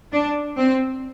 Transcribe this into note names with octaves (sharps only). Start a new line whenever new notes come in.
D4
C4